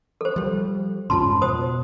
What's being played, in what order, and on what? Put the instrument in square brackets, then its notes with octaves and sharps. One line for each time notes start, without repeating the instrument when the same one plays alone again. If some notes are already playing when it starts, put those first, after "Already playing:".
[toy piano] A4 C5
[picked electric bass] F3 G3
[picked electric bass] F2 G#2 C#3 [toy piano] F4 A5 C6
[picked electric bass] B2 [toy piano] C5 D#6